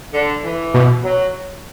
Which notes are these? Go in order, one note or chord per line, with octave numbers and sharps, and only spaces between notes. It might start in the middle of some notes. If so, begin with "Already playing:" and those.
D3
E3
B2
F#3